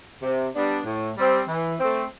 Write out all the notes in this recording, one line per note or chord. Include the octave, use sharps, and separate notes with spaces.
C3
G3 B3 D4
A2
G3 C4
E3
A3 C4